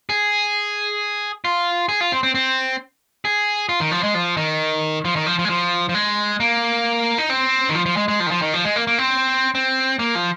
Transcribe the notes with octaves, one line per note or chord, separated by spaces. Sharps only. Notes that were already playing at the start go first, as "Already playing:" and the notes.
G#4
F4
G#4
F4
C4
C4
C4
G#4
F4
D#3
F3
G#3
F3
D#3
F3
D#3
F3
F3
G#3
F3
F3
G#3
A#3
D#4
C4
D#3
F3
F3
G#3
G#3
F3
D#3
F3
D#3
F3
G#3
A#3
A#3
C4
C4
A#3
F3